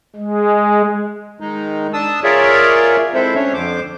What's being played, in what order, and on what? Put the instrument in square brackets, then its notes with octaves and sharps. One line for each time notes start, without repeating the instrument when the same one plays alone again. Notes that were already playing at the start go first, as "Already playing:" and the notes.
[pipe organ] G#3
[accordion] D#3 G#3 D#4
D4 A5 D#6 E6
F4 G#4 A#4 C#5 D5 E5
G#3 C4 E4 A4 C5 E5
C#4 D4 C#5
F2 D3 C5 D6